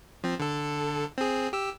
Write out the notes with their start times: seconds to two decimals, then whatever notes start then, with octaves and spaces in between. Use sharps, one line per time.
0.24 F3 C4
0.40 D3 A4
1.18 C4 G#4
1.53 G4 E6